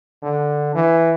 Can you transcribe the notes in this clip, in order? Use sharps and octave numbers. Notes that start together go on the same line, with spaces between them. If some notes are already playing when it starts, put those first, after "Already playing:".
D3
E3